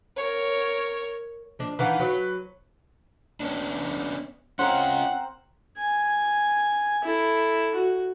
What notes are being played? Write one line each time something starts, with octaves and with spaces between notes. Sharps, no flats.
A#4 C#5
F3 D4
D#3 E3 D4 B4 F5 F#5
F#3 B4
B3 C#4 D4
C4 C#4 F4 A#4 C5 F#5
G#5
E4 A4
F#4